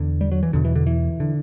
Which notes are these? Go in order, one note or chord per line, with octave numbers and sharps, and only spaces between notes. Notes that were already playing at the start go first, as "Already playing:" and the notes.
Already playing: E2 D3
G3
F#3
E3
E2 B2 D3
E3
D3
E3
D3